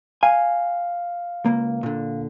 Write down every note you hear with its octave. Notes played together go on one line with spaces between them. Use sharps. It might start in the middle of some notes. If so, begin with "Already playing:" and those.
F5 G#5
C#2 A#3
A#2 D3